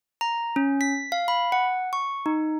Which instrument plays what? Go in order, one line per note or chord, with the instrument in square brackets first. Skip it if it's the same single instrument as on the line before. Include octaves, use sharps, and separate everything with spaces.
[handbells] A#5
C#4
B6
F5
B5
F#5
C#6
D#4